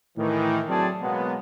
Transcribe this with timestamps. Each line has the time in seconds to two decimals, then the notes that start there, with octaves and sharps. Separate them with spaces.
0.18 A2 D#3 E3
0.69 F#3 A3 C4 G#4 D5 A5
1.02 B2 F#3 G#3 A#3 B3